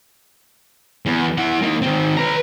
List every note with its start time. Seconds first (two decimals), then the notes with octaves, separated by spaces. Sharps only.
1.06 E2
1.38 E4 F#5
1.62 A#3 D#4
1.82 D#3 C4
2.17 B4 A#5